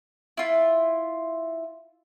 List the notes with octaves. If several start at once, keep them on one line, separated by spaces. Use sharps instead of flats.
E4 F4